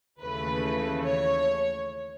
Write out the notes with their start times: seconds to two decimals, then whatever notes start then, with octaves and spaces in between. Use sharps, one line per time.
0.21 D#2 C#3 E3 A3 B4
1.04 C#5